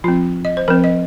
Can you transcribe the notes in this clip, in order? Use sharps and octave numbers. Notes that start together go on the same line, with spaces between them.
F3 C4 F4
D#5
C5
F3 C4 A#4
D#5